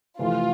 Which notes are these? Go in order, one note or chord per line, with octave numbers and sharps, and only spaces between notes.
F2 C3 E3 A3 F4